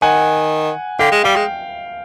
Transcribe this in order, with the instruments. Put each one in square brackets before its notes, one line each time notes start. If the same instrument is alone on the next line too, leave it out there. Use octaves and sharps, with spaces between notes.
[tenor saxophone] D#3 [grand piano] F#5 G#5
[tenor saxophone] D3 [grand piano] F5 G5
[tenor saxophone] G#3
[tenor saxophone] G3 [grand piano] F5 G5
[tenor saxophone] G#3